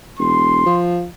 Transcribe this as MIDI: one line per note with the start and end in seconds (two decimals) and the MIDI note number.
0.19 0.63 28
0.19 0.79 84
0.66 1.05 53